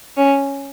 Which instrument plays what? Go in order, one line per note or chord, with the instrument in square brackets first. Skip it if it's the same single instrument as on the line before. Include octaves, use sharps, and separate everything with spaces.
[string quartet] C#4